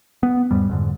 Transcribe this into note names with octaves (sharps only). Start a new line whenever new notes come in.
B3
E2 G#2 G3
F2 G#2 D3